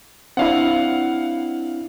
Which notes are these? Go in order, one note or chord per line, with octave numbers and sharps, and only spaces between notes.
C4 D4 E4 F5 F#5